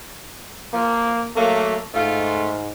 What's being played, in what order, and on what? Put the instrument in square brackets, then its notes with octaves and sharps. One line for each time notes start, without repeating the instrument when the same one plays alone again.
[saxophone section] F3 [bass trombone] A#3
[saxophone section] F#3 A#3 [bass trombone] A3
[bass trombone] G#2 [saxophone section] A3 F4